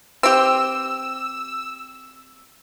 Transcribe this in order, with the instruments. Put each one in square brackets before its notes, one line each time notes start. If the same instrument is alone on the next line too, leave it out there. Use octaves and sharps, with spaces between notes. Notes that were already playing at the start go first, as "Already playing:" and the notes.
[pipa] C4 G4 [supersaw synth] E6